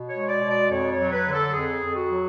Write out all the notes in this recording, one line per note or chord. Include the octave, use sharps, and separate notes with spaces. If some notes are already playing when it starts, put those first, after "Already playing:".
Already playing: B2
C#5
G#3
D5
B2
D5
F2 C#5
C#5
F#3
B4
D3
A4
F2 G#4
F2
F#4
F#3